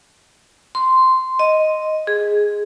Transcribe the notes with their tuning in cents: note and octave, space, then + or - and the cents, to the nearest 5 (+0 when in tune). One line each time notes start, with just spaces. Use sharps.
C6 -10
D#5 +0
G#4 +0